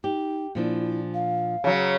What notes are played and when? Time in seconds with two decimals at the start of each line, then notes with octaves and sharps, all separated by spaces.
0.04 D#4 G4
0.55 A#2 F3 D4 E4
1.14 F5
1.64 C#3 F#3